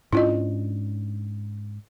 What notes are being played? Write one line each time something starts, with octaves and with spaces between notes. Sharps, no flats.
G#2 C#4 D4 E4 F4 D#5